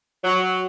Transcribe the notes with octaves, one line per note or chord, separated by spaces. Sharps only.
F#3